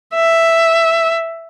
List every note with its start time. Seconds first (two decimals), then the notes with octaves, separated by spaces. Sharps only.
0.15 E5